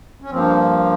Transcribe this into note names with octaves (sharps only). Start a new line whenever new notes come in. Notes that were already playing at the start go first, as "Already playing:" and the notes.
C#4
G2 F3 A#3 C4